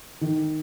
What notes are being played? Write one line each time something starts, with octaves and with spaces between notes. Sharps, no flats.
D#3